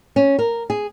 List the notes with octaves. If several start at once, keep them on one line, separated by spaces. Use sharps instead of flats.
C#4
A#4
G#4